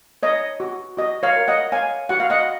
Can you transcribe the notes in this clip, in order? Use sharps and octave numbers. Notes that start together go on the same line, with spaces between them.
C#5 D#5
F#4
F#4 D#5
C#5 F5
A#4
D#5 F#5
C#5 F5 G#5
F#4 F#5
F5
D#5 F#5